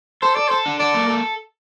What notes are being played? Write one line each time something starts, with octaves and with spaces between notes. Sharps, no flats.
A4 C5
A4 D5
A4 C5
D4
A4 D5
A#3
A4